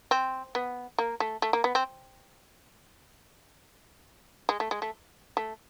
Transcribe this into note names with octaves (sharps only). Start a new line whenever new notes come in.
C4
B3
A#3
A3
A3
A#3
B3
C4
G#3
A3
G#3
A3
A3